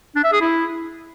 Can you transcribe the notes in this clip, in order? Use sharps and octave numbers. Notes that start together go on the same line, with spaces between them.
D4
E5
G#4
E4